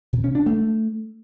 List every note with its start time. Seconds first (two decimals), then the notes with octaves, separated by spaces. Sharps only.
0.13 C3
0.24 C#4
0.35 D4
0.46 A3